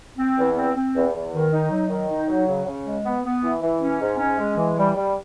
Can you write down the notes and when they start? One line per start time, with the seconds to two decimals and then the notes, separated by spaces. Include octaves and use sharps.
0.17 C4
0.37 E2
0.56 C4
0.75 C4
0.94 E2
1.14 E2
1.33 D#3
1.52 D#4
1.71 F#3
1.89 D#3
2.09 D#4
2.28 F#3
2.47 C#3
2.66 C#3
2.85 G#3
3.04 B3
3.23 B3
3.42 E3
3.61 E3
3.80 C#4
4.00 G#2
4.19 C#4
4.37 G#3
4.57 E3
4.76 G3
4.95 G3